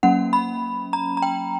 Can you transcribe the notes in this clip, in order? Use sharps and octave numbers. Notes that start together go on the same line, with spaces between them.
F#3 A#3 C#4 F#5
B5
A#5
A#5
G5